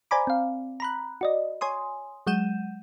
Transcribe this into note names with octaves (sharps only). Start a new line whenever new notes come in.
C5 D5 G#5 A#5 B5 D6
C4 F5
A#5 B5 F#6
F#4 D5 D#5
C#5 G#5 C6 D#6
F#3 G#3 F#5 G6 D#7 E7